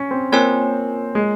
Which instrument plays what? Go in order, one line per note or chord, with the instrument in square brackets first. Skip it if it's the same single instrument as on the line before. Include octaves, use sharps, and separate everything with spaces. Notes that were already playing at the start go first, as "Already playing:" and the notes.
Already playing: [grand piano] C#4
C4
[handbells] A#3 F4 A#4 C#5 G#5 [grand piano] C4
[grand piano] G#3